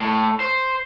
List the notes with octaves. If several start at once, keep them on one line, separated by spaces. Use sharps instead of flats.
A2
C5